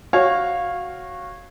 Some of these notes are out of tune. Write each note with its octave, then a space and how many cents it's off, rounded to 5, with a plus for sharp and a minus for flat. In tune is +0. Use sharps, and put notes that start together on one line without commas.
F#4 +0 C#5 -20 F5 +0